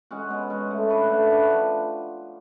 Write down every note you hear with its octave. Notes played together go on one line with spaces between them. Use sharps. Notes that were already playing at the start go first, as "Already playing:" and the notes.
G#3 C#4 F#4
B2
G#3 C#4 F#4
A3
D4 F#4 B4
A3
D4 F#4 B4
F3